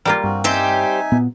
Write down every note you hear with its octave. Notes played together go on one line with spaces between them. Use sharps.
G3 A#3 F4
G2 C4 F#4
G3 C4 D#4 G4 C5 E5 G#5
A#2 B3